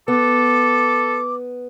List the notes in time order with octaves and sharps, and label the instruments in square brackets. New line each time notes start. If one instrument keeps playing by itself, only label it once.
[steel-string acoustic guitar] B3 [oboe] A4 [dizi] D6